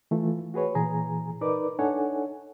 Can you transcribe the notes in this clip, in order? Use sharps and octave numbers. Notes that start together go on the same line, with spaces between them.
E3 A3 F4
F#4 G#4 B4 C#5
A#2 E3 G#4 G#5 A#5
D#4 A#4 B4 D5 D6
D4 D#4 A4 C#5 F#5 G#5